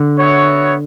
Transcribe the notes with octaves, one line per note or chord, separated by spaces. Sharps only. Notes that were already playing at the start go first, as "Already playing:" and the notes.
Already playing: D3
B3 F#4 C#5 E5